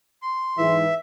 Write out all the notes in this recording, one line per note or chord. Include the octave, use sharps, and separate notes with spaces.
C6
G#2 E3 E5